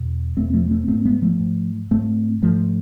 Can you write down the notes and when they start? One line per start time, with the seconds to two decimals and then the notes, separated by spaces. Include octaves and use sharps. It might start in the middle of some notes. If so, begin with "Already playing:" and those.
Already playing: E2 B2
0.37 E2 B2 A3 C4
0.53 F3 A3
0.71 A3 C4
0.88 G#2 A3 C4
1.05 G#3 B3
1.22 F3 A3
1.40 G#2
1.91 G#2 A3 C4
2.42 G#2 F3 A3